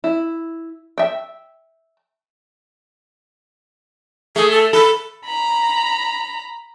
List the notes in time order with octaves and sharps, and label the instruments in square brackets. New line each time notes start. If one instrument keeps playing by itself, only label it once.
[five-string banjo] E4
E5 G5
[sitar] A3 [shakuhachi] G#4
[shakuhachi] A4
[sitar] A4 [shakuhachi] B5
[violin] A#5 B5